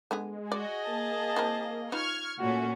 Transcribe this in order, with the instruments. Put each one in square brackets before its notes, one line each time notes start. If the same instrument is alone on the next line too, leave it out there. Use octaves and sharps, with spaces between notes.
[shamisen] D3 B3 G#4 [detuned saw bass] G#3
[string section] F#4 [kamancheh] G#4 D#5 [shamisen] D5
[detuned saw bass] A#3 [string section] A5
[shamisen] E3 C4 A#4
[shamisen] D#4 F4 B4 [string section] C#6 F6 G#6
[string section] A#2 C#4 [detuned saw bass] A3 [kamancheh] F#4